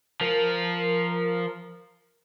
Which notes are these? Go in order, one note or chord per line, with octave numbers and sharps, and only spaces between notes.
F3 A#4